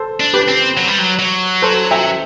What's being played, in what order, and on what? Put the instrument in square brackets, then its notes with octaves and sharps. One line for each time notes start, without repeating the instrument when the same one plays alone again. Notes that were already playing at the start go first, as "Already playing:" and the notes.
Already playing: [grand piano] A4 C5
[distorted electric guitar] D4
[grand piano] G4 B4
[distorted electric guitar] C4
F#3
G3
F#3
F#3
[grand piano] A4 C5
E5 G5